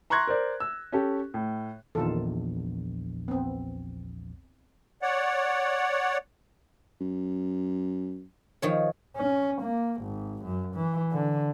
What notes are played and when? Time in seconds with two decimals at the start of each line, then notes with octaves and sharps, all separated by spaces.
0.10 A#5 C6 C#6 F#6 G#6 A#6
0.27 A#4 C5 D5
0.60 E6
0.92 C#4 G4 A4
1.34 A2
1.95 A#1 E2 D#3 F4 A4
3.28 B3 C4
5.02 C#5 D5 F#5
7.00 F#2
8.62 D#3 F3 C#5
9.16 C#4
9.62 A#3
10.02 G#1
10.44 F#2
10.75 E3
11.12 D3